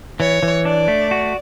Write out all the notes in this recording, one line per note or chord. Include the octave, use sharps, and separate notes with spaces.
E3 C#5
E3
D4 D5
A3
F#4